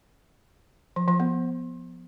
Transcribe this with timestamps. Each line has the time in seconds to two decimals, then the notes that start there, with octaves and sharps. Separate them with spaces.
0.96 F3
1.08 F3
1.20 B3